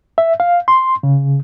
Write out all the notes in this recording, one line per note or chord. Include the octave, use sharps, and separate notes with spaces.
E5
F5
C6
C#3